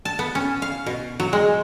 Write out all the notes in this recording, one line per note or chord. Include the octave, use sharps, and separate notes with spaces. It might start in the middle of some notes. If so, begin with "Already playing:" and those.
A5
B3
C#4
F5
B2
F#3
G#3